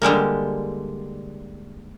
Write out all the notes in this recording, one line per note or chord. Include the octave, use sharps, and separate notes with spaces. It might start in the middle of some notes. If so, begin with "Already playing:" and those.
D3 G3 G#3 A#3